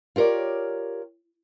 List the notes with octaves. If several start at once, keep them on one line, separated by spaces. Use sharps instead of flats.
F4 G4 A#4 C#5 D5